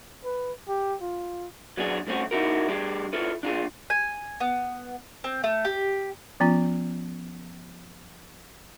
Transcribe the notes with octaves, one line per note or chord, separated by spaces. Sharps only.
B4
G4
F4
F#3 B3 D4 G#4
G2 A3 C4 C#4 F#4
D#4 E4 F#4 A#4
G3 D4 G4 G#4
E4 F4 A4 B4
D4 F4 G#4
G#5
B3
C4
A3
G4
F3 B3 C#4 F4